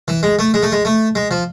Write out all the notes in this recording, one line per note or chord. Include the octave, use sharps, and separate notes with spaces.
E3
G#3
A3
G#3
A3
G#3
A3
G#3
F3